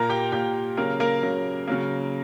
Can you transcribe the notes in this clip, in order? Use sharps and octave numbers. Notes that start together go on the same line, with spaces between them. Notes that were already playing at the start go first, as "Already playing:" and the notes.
Already playing: A#2 A#3 A#4 A#5
G4 G5
A#2 A#3 G4 G5
C#3 F#3 A#3 A#4
A#3 A#4
C#3 F#3 A#3
C#3 F#3 A#3